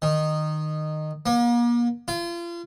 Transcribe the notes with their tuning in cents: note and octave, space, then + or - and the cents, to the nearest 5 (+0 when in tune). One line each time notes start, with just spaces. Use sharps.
D#3 -15
A#3 +40
F4 -35